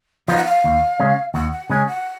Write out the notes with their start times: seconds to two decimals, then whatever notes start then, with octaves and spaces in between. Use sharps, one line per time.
0.28 F3 B3 D#4 F5
0.37 F#5
0.44 F5
0.64 D#2
1.00 C#3 G#3 C#4
1.34 D#2 F#5
1.52 F#5
1.69 C#3 G#3 C#4 G#5
1.87 F#5